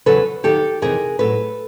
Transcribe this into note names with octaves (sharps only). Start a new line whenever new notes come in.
E2 C#3 F#3 A4 B4
D#2 D#3 F#3 G4 A4
F2 C3 E3 G#4 A#4
A2 F#3 A4 B4